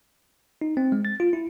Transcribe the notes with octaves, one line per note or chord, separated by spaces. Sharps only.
D#4
C4
G#3
A6
F4
E4